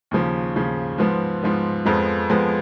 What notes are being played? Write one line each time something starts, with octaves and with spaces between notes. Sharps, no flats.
D#2 C#3 F3
D#2 C#3 F3
G#2 F3 B3
G#2 F3 B3
F2 F3 G#3 B3
F2 F3 G#3 B3